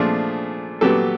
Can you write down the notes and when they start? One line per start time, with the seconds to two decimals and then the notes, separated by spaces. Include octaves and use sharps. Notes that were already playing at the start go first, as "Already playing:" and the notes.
Already playing: A#2 F3 A3 D4 G#4
0.81 A#2 F#3 B3 G4 A4